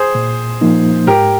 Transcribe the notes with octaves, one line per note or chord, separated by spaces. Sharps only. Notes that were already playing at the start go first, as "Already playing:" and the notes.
Already playing: G#4 C5
A#2
F3 A#3 D#4
G#2 G4 A#4